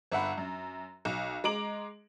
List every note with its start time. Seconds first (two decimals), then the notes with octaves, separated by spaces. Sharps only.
0.12 G1 E5 F#5 B5
0.38 F#2
1.05 B1
1.44 G#3 A#5 D6 D7 F#7